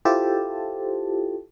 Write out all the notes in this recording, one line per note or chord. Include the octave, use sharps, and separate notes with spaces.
E4 F4 G4 A4 C5 A5